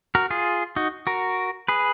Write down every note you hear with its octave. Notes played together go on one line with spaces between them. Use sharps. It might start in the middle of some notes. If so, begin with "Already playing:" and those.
F#4 A#4
F4 G#4
D#4 F#4
F#4 A#4
G#4 B4